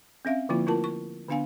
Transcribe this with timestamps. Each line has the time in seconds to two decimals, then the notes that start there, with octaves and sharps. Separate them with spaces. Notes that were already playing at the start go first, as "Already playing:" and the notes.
0.25 C4 C#4 E5 F5
0.49 D3 F3 A#3 E4 F4
0.67 A3 E4 F4 A#4 A5
0.84 C#6
1.29 D3 B3 D4 F5 G#5